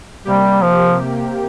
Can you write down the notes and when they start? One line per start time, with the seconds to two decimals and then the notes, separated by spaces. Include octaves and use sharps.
0.25 C3 G3 A#3 G4
0.62 F3